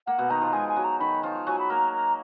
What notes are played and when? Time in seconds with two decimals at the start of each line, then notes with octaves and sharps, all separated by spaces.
0.07 A#3 F#5
0.18 B2 B3
0.30 D#3 D#4 A#5
0.41 F3 F4
0.53 G#3 G#4 G#5
0.69 G#5
0.76 F#3 F#4
0.84 A#5
0.99 D#3 D#4 B5
1.23 F3 F4
1.46 F#3 F#4 G#5
1.59 B5
1.70 A#3 A#4 A#5
1.94 A#5